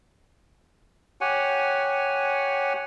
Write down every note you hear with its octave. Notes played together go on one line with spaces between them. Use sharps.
G4 C#5 F#5 G#5